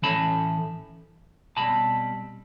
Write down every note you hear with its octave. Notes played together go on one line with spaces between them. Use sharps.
A2 E3 A3 C#4 A5 B5
B2 G3 C4 A5 B5